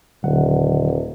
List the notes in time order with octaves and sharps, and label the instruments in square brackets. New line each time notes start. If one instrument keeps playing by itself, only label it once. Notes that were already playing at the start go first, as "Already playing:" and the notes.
[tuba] D#1 [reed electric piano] D3 F#3 F#5